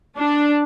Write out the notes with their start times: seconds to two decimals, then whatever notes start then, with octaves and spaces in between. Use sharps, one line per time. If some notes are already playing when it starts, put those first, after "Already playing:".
0.17 D4